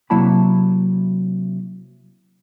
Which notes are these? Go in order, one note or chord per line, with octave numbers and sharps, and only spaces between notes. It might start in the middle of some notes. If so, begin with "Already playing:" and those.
C3 F#3 A#3 E4 A5 B5